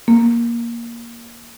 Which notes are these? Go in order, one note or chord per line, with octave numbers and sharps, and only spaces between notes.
A#3